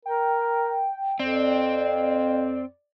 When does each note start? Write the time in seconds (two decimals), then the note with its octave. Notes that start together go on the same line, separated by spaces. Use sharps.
0.06 A#4 G5
1.20 F2 C4 D5